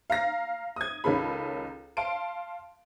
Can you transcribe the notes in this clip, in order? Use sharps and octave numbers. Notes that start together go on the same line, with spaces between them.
F5 A#5 A#6
D#6 G#6
C#2 D#3 C#4 A4 B5
F5 A5 C6 D7